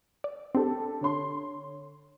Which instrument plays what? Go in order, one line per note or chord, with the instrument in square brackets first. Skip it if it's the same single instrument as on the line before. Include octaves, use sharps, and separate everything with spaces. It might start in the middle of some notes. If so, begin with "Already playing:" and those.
[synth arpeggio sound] D5
[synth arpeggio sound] C4 [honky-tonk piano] D4 G4 A4
[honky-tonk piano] D3 C#5 C6